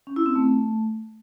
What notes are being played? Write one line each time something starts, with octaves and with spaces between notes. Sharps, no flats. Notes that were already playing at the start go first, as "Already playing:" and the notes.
C#4
E4
C4
A3